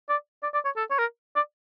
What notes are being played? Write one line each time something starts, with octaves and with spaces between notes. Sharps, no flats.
D5
D5
D5
C#5
A4
C#5
A#4
D5